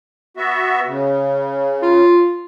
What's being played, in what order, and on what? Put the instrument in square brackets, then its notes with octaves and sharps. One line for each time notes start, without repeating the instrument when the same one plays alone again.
[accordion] B3 F#4 E5
C#3
[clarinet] F4